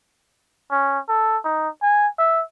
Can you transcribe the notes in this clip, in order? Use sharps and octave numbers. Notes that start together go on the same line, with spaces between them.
C#4
A4
D#4
G#5
E5